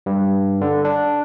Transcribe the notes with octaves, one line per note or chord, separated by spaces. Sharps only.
G2
D3
D4